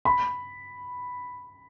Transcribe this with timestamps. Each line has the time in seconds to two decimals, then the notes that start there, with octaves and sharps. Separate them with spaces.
0.05 B5